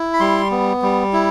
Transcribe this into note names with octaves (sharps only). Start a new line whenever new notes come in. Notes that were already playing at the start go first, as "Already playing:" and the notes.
Already playing: E4
B5
G3 C6
B3
G3
E4